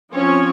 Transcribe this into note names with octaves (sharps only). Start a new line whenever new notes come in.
F3 C4 C#4 C#5